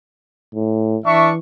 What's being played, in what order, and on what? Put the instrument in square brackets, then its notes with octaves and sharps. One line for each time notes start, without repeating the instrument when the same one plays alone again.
[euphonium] A2
[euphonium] E3 [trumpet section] D4 E5 C#6